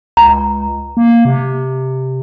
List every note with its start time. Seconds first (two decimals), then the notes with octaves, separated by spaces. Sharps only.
0.17 C#2 A#5
0.97 A#3
1.25 C3